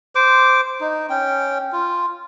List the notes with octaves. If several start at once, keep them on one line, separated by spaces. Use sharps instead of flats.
C5 D6
D#4
C#4 G5
F4